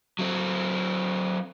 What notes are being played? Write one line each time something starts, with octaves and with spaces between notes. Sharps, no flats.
F#3 C4